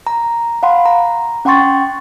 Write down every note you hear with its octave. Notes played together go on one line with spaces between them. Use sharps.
A#5
F5 F#5 B5 C6
A#5
C#4 F#5 G5 C6 C#6 A6